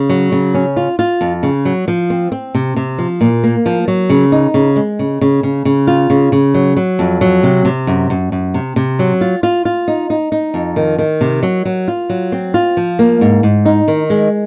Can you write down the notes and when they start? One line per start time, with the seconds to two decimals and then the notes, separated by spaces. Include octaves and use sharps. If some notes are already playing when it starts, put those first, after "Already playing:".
Already playing: C#3
0.09 F#3
0.32 C#3
0.54 C#4
0.76 F4
0.99 F4
1.21 F2
1.43 C#3
1.65 F#3
1.88 F3
2.10 C4
2.32 C4
2.55 C3
2.76 C3
2.98 F3
3.21 A#2
3.44 A#3
3.66 F3
3.88 F#3
4.10 C#3
4.32 D#4
4.54 C#3
4.76 G#3
4.99 C#3
5.21 C#3
5.43 C#3
5.65 C#3
5.87 F4
6.10 C#3
6.32 C#3
6.54 F#3
6.77 F#3
6.99 F2
7.21 F#3
7.43 C3
7.65 C3
7.87 F#2
8.10 F#2
8.32 F#2
8.54 C3
8.76 C3
8.99 F#3
9.21 F4
9.43 F4
9.65 F4
9.88 D#4
10.10 D#4
10.32 D#4
10.54 F2
10.76 D#3
10.99 D#3
11.21 C3
11.43 F#3
11.65 F#3
11.88 F4
12.10 F#3
12.32 C4
12.54 F4
12.77 F3
12.99 A#3
13.21 G#2
13.43 G#2
13.65 D#4
13.88 D#3
14.10 G#3